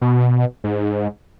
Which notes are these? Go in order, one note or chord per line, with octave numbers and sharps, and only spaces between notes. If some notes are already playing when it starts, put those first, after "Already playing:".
B2
G#2